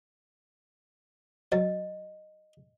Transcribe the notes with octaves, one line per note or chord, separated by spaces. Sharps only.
F#3 D#5